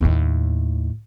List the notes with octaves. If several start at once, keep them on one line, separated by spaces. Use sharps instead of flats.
D#2 A2